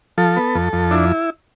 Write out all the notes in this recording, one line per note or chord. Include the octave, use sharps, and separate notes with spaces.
F3 A4
B3
F2
F2
D4 E4